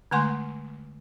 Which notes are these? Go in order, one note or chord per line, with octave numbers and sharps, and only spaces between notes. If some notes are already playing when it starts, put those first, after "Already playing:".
D3 G#3 A3 G#5 C6 C#6